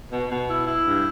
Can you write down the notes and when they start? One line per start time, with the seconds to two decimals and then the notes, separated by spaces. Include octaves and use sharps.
0.12 B2
0.30 B2
0.49 E4
0.67 E4
0.86 G2